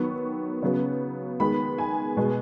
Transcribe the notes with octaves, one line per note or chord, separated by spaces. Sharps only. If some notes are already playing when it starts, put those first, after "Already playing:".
Already playing: D#3 F#3 B3 C#6
C#3 F#3 B3
D#3 G#3 B3 B5
G#5
B2 G#3 B3